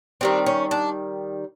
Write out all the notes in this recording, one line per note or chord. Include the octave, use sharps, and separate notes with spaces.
D#3 G3 C4 D4
C#4
D4